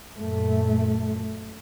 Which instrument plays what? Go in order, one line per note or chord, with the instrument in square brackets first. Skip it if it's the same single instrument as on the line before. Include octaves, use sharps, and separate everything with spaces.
[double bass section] F#2 A#2 A3